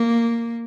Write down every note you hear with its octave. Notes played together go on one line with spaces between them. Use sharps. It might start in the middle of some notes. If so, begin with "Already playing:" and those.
Already playing: A#3